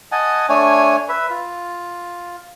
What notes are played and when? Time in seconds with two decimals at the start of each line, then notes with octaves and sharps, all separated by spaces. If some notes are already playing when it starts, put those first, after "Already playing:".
0.12 D#5 F#5 G#5 A5
0.49 A3 D4 C#5 G#5
1.09 B4 E5
1.30 F4